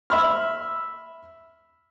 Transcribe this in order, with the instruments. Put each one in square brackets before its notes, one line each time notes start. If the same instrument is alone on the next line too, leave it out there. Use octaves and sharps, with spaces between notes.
[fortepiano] E5 B5 F6